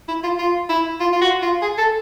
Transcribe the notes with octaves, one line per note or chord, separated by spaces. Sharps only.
E4
F4
F4
E4
F4
F4
F#4
F4
G#4
A4